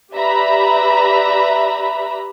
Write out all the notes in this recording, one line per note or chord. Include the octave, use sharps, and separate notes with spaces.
G4 B4 D5 E5 A#5 B5